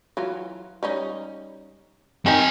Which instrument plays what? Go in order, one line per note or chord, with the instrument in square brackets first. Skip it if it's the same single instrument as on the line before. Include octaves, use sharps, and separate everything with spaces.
[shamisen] E3 F#3 F4
G3 C#4 D#4
[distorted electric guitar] C4 G#5 [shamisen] D#4 A#4 G5